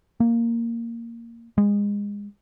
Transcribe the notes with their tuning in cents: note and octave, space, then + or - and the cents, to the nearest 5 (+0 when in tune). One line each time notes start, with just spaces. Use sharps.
A#3 -10
G#3 -25